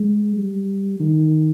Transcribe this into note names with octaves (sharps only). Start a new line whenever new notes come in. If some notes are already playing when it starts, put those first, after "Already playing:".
Already playing: G#3
G3
D#3